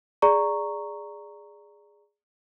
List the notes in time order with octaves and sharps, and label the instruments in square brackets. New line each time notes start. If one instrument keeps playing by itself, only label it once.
[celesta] G#4 D5 A#5 C#6